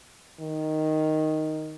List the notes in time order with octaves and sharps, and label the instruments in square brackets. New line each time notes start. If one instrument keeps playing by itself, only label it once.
[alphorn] D#3